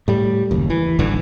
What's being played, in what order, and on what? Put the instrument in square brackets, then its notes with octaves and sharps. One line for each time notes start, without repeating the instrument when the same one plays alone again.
[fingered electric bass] A2 G3
F#1 D#2
E3
G#1 G2 D3 E3